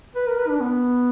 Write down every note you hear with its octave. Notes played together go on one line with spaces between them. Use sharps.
B4
A#4
B4
D4
B3